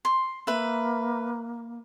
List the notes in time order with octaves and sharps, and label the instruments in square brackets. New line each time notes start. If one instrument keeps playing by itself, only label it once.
[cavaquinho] C6
[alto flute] A#3 [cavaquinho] B4 E5